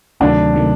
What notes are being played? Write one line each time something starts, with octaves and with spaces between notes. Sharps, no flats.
D2 C3 D#3 F#3 A3 D4
C3 D#3 F#3 A3